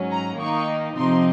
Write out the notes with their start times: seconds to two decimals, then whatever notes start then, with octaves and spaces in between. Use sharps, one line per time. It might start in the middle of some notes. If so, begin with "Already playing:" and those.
Already playing: G#2 F#3 C#4
0.11 A#5
0.40 D#3 A#3 D#4 C#6
0.96 C3 F3 C4 D#4 C6